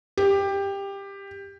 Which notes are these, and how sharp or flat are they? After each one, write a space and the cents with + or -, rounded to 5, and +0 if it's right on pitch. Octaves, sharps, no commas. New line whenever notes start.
G4 +15